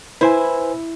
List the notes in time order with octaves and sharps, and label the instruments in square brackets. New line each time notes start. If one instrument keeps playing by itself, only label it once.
[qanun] E4 [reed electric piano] B4 C5 G#5